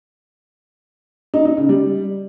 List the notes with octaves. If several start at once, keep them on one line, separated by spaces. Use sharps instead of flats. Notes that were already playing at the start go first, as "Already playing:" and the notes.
D#4
D#4
C#3
G3